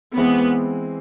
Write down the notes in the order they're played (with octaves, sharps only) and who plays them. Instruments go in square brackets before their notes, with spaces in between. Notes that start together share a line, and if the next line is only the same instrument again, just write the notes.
[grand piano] E3 G#3 C4 [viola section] B3